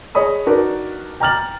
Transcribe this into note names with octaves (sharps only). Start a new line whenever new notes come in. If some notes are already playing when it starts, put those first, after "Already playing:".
G#4 C#5 D#5 B5 D#6
D4 D#4 F#4 A#4 B4 D5
G5 A#5 D6 F6 A6 F#7